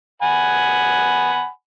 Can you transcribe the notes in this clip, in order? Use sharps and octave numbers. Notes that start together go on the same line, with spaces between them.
F#5 G#5 B5